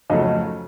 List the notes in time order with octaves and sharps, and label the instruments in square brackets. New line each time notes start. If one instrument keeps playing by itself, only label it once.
[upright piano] F2 C#3 F#3 A3 D#4 D#5